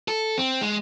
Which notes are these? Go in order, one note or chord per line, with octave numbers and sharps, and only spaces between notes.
A4
C4
G#3